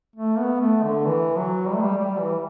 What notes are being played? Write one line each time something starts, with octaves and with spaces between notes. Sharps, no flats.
A3
B3
A3
D3
E3
F#3
G3
A3
G3
G3
E3